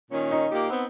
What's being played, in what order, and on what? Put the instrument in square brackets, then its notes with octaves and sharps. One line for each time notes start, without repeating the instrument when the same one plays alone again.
[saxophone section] A#2 D#3 C#4
[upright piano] D#4
[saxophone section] A#2 A#3 G4
B3 C4